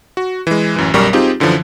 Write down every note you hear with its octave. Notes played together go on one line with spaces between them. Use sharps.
F#4
E3 G#3
A1 F#2 E3
B1 F#2 G3 G4 A#4 C#6
C4 D#4 F4 G4 G#4
F#2 D3 E3 F3